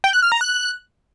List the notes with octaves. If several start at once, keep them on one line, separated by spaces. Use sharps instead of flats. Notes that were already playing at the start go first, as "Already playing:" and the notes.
G5
F#6
F6
A#5
F#6